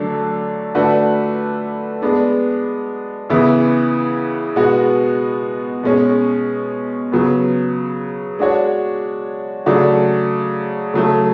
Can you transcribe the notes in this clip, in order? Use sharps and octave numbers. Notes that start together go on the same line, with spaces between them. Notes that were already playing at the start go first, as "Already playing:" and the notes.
Already playing: D3 F#3 A3 D4
D3 A3 D4 F#4 B4
G#3 B3 D4
C#3 E3 B3 E4
B2 G#3 B3 F#4
B2 G#3 C#4
C#3 F#3 B3
G#3 D4 F#4 C#5
C#3 F#3 A3 D4 F#4
C#3 F#3 A3